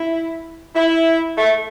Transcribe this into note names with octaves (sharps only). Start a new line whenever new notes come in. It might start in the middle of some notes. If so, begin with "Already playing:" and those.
Already playing: E4
E4
A3